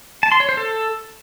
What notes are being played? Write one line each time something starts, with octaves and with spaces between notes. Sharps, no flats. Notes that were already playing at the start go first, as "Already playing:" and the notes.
A5
C6
C#5
C5
A4